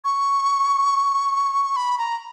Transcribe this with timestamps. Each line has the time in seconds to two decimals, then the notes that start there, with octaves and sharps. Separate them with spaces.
0.05 C#6
1.76 B5
1.98 A#5